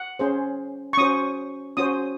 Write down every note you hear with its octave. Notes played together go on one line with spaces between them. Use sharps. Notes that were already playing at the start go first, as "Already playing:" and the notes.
Already playing: F#5
C#4 G#4 C5
C#6
C#4 F#4 C5 D#6
C#4 F#4 C5 D#6